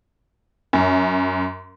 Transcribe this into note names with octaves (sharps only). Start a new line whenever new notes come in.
F#2